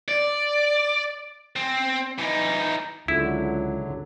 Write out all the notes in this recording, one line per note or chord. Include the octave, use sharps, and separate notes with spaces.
D5
C4
E3 D#4
C#2 D3 F#3 E4